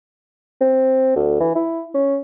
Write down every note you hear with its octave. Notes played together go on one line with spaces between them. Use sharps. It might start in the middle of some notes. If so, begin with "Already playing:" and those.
C4
D2
E3
E4
C#4